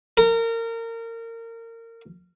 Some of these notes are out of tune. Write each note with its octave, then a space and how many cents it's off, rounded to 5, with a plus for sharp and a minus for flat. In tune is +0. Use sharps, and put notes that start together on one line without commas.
A#4 -25